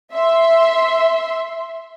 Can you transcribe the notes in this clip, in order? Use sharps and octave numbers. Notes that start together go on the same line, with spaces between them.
E5 C6